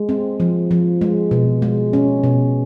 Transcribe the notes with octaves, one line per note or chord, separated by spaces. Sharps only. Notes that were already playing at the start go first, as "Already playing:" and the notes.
Already playing: G#3
C4
F3
F3
G#3
B2
G#3
C#4
B2